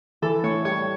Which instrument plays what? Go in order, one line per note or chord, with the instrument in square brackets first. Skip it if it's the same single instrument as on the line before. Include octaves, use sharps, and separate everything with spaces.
[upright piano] E3 [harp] A4
[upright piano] A2 [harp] C#5
[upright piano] G3 [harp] C#5